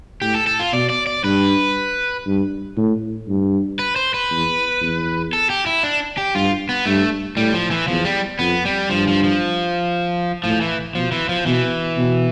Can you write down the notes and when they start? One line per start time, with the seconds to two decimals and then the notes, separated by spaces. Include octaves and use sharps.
0.22 A2 G4
0.35 A4
0.47 A4
0.60 F4
0.73 B2 D5
0.90 D5
1.07 D5
1.24 G2 B4
2.26 G2
2.77 A2
3.28 G2
3.79 B4
3.96 C5
4.14 B4
4.31 E2
4.81 E2
5.33 A4
5.50 G4
5.66 E4
5.83 D4
6.18 G4
6.35 G2 F4
6.69 B3
6.85 G2 A3
7.37 A2 G3
7.54 F3
7.71 E3
7.88 E2 F3
8.05 G3
8.39 F2 B3
8.65 G3
8.90 G2 F3
9.08 F3
9.24 F3
10.44 A2 F3
10.61 E3
10.94 B2 F3
11.12 E3
11.29 F3
11.46 B2 E3
11.97 B2